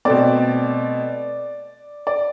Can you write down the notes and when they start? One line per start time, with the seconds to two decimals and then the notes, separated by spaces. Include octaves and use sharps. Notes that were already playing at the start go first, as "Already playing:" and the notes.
0.05 B2 A3 C4 D5
2.07 D5